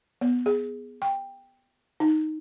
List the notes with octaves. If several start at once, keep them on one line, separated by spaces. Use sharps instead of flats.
B3
G#4
G5
D#4